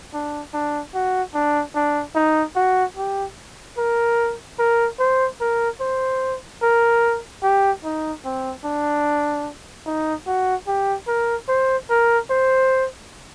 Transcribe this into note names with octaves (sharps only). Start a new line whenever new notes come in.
D4
D4
F#4
D4
D4
D#4
F#4
G4
A#4
A#4
C5
A#4
C5
A#4
G4
D#4
C4
D4
D#4
F#4
G4
A#4
C5
A#4
C5